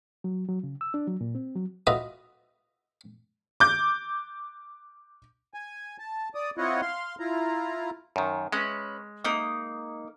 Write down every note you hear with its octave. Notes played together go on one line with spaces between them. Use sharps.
F#3
F#3
C#3
E6
D4
F#3
A#2
C4
F#3
F4 F#4 B4 D#5 E5
D6 G6
G#5
A5
D5 D#6
C4 E4 F4 C#5 D#5 F#5
F5 C6
E4 F4 A#5
F#2 D#3
G#3 C#4 B4
A#3 D#4 D#6